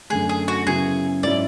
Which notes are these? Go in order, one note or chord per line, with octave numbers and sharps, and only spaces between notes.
F#2 D3 A3 G#4
G#4
F#4
F#2 C#3 F#3 B3 E4 G#4
G#2 F#3 C#4 E4 D5